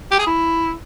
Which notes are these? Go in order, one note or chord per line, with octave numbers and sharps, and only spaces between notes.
G4
G#4
E4